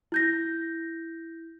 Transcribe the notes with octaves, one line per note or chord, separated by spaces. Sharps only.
E4 G6 A#6